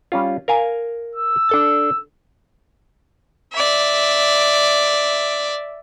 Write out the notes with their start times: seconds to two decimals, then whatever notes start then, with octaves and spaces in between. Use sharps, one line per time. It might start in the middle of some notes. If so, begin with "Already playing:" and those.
0.12 G3 C#4 F4
0.48 A#4 F5 G#5
1.15 E6
1.49 D4 A4 A5
3.53 D5 E5